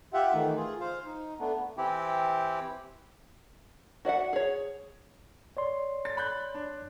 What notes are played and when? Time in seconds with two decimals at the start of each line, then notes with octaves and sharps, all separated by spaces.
0.14 F4 G4 E5 F#5
0.34 D#3 E3 A3 D#4
0.56 F4 G#4
0.80 C5 F5
1.06 D#4
1.40 A3 B3 D4
1.77 E3 C4 E4 G4
4.05 F#4 D5 E5 F#5
4.33 G#4 C#5
5.57 C#5 D5 C6
6.05 A6
6.17 B5 F#6 G6
6.54 D4